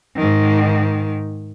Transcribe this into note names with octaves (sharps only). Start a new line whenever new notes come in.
G#2 D#3